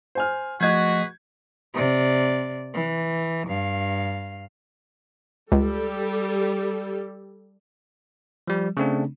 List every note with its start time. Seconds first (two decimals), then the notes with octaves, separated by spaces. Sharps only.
0.15 C5 G#5 F6
0.60 F3 A3 F#4 G#4 B4 D#5 G6 G#6
1.74 C3 D5
2.74 E3
3.47 G2 F5
5.52 C#2 G3 G4 A4
8.47 F3 G3
8.77 C#3 A3 C4 D4